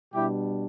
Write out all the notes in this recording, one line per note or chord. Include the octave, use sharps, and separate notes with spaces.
B2 G3 D4 E4 G4